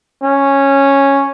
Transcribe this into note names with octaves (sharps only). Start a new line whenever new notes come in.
C#4